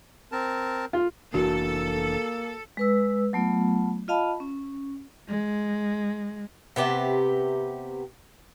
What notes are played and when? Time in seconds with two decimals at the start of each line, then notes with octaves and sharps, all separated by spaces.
0.32 C4 A#4 A5
0.93 F4
1.34 F1 E3 A#3 D4 F#4 A4
2.77 G#3 B4 E6
3.33 F#3 A3 B3 F4
4.08 F4 D#5 F5 A5 B5
4.40 C#4
5.28 G#3
6.76 C3 B3 G4 E5